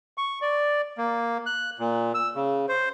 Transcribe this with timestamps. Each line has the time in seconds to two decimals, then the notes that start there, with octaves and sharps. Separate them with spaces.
0.18 C#6
0.42 D5
0.98 A#3
1.46 F#6
1.79 A#2
2.14 E6
2.35 C#3
2.69 C5